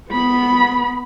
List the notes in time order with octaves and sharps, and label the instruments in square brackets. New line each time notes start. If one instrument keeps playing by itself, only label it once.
[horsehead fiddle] B3 B5